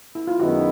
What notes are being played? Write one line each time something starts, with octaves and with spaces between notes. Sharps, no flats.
E4
F4
F#2 D#3 G#3 B3 E4 F#4